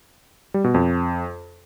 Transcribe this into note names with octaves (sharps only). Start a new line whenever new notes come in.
G3
B2
F2